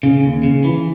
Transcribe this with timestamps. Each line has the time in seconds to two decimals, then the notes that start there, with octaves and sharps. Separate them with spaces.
0.03 C#3
0.24 D#2
0.43 C#3
0.64 E3